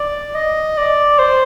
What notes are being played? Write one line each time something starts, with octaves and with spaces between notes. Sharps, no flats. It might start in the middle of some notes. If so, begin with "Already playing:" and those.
Already playing: D5
D#5
D5
C5